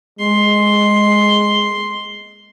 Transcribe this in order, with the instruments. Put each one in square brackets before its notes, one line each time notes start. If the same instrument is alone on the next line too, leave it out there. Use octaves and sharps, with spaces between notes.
[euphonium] G#3 [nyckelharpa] C6